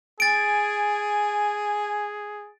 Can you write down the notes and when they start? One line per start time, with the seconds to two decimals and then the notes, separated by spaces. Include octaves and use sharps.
0.20 G#4 G#5 A6 D7